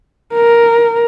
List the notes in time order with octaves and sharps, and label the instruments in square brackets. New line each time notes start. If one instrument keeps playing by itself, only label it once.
[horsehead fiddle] A#4